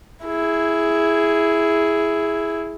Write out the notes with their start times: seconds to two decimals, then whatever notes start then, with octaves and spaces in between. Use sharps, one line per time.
0.24 E4 G#4